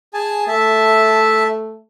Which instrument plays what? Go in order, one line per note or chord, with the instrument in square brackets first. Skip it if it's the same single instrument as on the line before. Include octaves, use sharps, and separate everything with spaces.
[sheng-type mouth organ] G#4 G#5 A5
[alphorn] A3 [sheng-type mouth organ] E5 A5